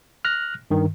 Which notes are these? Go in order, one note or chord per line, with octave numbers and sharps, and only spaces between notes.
F6 F#6 A#6
G2 D#3